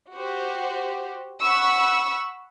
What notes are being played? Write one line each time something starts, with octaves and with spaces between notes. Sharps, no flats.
F#4 G4 C5
F#5 B5 C#6 E6